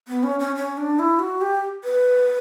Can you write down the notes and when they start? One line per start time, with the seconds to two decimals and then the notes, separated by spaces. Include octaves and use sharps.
0.08 B3
0.23 C#4
0.40 C#4
0.56 C#4
0.77 D4
0.99 E4
1.19 F#4
1.41 G4
1.84 B4